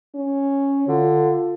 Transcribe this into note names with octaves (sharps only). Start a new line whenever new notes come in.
C#4
D3 F4